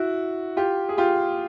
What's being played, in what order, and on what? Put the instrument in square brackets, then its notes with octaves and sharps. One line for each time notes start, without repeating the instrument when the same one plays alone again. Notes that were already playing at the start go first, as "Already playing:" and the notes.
Already playing: [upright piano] E4 F#4
F4 G4
G#4
F4 G4